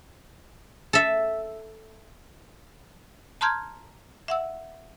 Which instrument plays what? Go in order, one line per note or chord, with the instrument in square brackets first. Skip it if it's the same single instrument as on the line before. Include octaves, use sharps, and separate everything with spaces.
[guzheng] A4 E5
[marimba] A5 A#5 C6 F6 G6 G#6
E5 F#5 E6